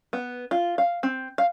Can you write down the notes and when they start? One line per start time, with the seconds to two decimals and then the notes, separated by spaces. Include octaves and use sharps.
0.13 B3
0.51 F4
0.78 F5
1.03 C4
1.38 F5